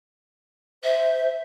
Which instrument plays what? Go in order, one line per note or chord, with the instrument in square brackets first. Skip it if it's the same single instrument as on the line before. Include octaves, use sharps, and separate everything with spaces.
[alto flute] C5 [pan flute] E5